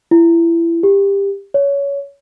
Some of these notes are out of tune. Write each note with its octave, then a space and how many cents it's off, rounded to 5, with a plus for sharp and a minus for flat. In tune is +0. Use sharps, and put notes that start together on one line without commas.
E4 +25
G4 +20
C#5 +20